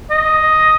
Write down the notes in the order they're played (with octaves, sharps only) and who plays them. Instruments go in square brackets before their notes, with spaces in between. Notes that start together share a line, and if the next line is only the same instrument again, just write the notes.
[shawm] D#5